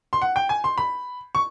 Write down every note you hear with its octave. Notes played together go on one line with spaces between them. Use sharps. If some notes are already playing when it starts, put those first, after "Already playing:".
C6
F#5
G5
G#5
C6
B5
C#6